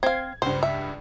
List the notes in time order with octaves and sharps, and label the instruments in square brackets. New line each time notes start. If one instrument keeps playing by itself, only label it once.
[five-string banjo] C4 F5 [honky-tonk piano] G#6
[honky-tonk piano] C#2 G2 [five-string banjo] C5
[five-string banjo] E5